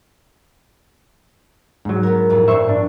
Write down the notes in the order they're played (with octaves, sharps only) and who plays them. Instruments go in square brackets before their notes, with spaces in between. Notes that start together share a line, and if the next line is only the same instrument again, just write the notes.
[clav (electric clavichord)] G#2 F#3
[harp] B3 A#4
F2 A2
[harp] G2 C#6 [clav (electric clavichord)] C5 E5
[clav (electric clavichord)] D4